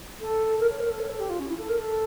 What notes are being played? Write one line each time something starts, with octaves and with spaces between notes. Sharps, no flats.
A4
A#4
C#5
A#4
A4
C#5
A4
G4
F4
C#4
E4
A4
A#4
A4